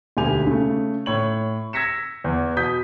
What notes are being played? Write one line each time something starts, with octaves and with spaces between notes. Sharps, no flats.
E1 D2 G4 G#5 F7
C#3 A3
A2 C#5 F#7
E6 G#6 A#6 B6 C#7 E7
E2
B2 D#6 G6 B6